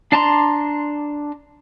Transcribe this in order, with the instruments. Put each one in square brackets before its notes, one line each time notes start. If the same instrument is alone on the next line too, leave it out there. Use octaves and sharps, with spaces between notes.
[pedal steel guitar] D4 D5 A5 A#5 C6